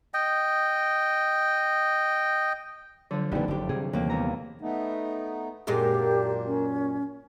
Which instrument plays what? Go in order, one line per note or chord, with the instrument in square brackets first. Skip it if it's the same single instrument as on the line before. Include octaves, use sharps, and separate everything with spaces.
[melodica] D#5 G5
[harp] D3 F3 [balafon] F#3
[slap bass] A1 C#3 E3 [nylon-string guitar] G3 B3 [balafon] D#4 D5
[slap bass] F#1 [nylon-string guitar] D4 G4
[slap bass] C3 F#3 G3 [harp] G#4
[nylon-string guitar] D#2 A#3 [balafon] E3
[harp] E2 A#5
[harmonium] A3 B3 D#4
[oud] F#2 A#2 G#3 [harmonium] A#3 D4 [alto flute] G4
[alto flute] C#4